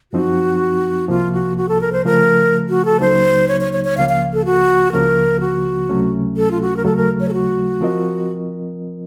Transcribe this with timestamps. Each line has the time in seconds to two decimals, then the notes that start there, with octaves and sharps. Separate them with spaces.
0.12 F#2 F3 C4 D#4 F#4
1.08 C2 C3 F3 A#3 F4
1.33 F#4
1.58 F#4
1.69 A4
1.81 A#4
1.93 C5
2.05 C#3 F3 A3 A#4
2.69 F#4
2.85 A4
3.00 C#2 C#3 F#3 A#3 D#4 C5
3.48 C#5
3.61 C#5
3.73 C#5
3.85 C#5
3.97 C#2 C#3 F3 A#3 F5
4.09 F5
4.33 A4
4.45 F#4
4.92 C#2 C#3 F3 A#3 A#4
5.40 F#4
5.89 C#2 C3 F#3 A3 C#4
6.37 A4
6.51 F4
6.61 F#4
6.76 A#4
6.84 D#2 C#3 F#3 A3 A4
6.96 A#4
7.20 C#5
7.28 A4
7.33 F#4
7.81 F3 C4 F4 A#4 D#5